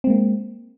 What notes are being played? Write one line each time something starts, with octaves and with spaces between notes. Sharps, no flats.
G#3 A#3 C4